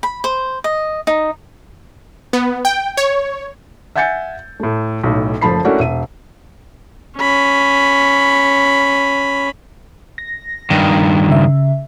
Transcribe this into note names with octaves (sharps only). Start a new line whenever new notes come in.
B5
C5
D#5
D#4
B3
G5
C#5
E5 F#5 G#5 G6 A6 C#7
A2 A3
B1 A2
F#1 F3 A3 A5 B5 C7
A3 C#4 D4 E4 F#4 A#4
E1 E5 D#7
C#4 B5
A#6
G2 D#3
C#3 E5